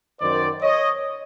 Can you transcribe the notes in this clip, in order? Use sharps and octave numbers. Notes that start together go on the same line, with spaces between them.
F#2 D#3 C5 D5
C#5 D#5